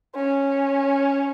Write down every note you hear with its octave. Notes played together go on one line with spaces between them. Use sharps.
C#4